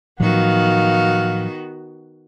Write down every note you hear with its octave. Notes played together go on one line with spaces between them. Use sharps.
A2 D#3 F3 F#3 B3 F#4 F5